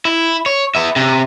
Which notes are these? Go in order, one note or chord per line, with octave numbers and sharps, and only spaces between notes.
E4
C#5
B3 E5
C3